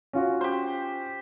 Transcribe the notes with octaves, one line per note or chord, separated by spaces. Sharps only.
C#4 F4 F#4
G4 C5